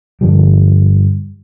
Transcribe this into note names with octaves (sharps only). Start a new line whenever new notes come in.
G2 D3 F3 G3